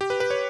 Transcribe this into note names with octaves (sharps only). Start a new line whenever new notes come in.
G4
B4
B4
C#5